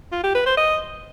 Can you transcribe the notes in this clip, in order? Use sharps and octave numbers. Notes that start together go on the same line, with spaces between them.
F4
G4
B4
C5
D#5